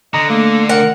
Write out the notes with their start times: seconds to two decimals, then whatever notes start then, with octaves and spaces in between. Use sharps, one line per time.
0.14 D3 D#5 A#5
0.30 A3 A#3
0.69 A#4 F#5